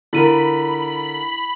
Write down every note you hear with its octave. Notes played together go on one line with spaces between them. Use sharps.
D3 E4 F4 A#4 B5 D#7